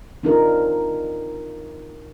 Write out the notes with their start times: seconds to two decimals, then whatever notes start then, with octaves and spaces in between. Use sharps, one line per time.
0.23 C4 D4 D#4 F4 A#4